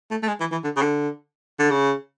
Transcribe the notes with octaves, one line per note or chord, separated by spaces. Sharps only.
A3
A3
G#3
E3
E3
D3
C#3
D3
D3
C#3